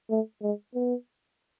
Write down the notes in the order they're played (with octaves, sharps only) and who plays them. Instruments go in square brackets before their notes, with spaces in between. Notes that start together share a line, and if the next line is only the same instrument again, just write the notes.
[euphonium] A3
G#3
B3